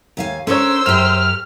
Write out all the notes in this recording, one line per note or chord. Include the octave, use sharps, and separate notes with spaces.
D#2 F5 G#5
C#4 D4 A4 A#4 C5 C#5 E6
F#2 G4 F6